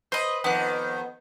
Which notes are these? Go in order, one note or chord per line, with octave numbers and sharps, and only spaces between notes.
B4 C5 D#5
F2 D#3 B3 F#6